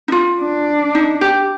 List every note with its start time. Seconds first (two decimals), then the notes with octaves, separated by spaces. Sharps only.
0.08 D#4
0.12 F4
0.40 D4
0.95 D#4
1.21 G4